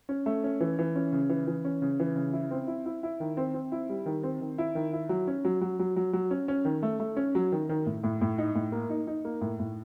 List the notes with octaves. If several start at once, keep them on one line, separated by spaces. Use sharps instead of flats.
C#4
A3
C#4
E3
E3
C#4
C#3
E3
E3
C#4
C#3
E3
C#3
E4
C4
E4
E4
E4
D#3
C4
C4
E4
G3
D#3
C4
D#3
E4
D#3
E4
F#3
C#4
F#3
F#3
F#3
F#3
F#3
C#4
C#4
D#3
A3
A3
C#4
F#3
D#3
D#3
A2
A2
A2
D#4
A2
A#3
D#4
D#4
A#3
A2
A2